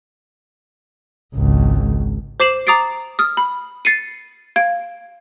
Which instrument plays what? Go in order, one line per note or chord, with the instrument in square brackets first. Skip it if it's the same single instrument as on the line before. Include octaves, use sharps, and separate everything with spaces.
[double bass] G#1 C#2
[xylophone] C5 D6 C7 E7 F#7
A#5 D6 D#6 A6 C7 D7
D#6 F6
B5
A6 C7 C#7 D#7
F5 G#6 D7